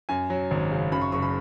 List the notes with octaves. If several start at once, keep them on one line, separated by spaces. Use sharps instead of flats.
F#2 G#5
F#3
G#1
C#3
F#2 B5
C#6
F#1 C#6
B5